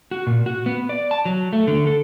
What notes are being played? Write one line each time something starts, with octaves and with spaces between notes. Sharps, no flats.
F#4
A#2
F#4
B3
D5
A5
F#3
A3
D3
A4